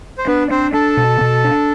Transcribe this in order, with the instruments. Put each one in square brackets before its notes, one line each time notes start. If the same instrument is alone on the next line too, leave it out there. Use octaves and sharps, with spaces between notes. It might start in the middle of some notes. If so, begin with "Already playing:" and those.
[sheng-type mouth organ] C5
[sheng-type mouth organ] B3 B4 [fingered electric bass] D4
[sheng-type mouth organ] C4 C5 [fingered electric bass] D4
[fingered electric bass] D4 [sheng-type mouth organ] A4 A5
[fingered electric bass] B2
B2
D4